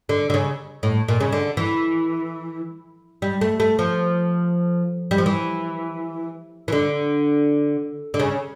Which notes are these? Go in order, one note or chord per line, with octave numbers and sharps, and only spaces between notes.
D3
D3
C#3
A2
A#2
C#3
D3
E3
G3
A3
A3
F3
G3
F3
E3
E3
D3
D3
C#3